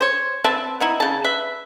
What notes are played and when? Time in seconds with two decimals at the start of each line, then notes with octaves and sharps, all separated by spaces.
0.01 C5 C#5
0.44 C4 B4 E5 A5
0.80 B3 D#4 E4
1.00 C#3 A5
1.24 B4 E5